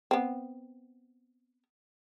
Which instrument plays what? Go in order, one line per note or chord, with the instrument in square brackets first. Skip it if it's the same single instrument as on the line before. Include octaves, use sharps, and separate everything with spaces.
[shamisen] B3 C4